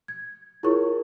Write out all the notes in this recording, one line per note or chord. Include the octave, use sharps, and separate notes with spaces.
G#6
E4 F4 G#4 A#4 C#5 C#6